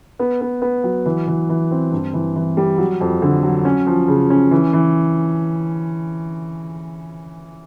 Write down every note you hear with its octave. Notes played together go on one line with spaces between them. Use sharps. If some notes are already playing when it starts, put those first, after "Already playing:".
B3
B3
B3
F#3
E3
E3
E3
C4
G2
E3
E3
G3
F#3
F2
D3
F#3
C#4
F3
C#3
C#4
E3
E3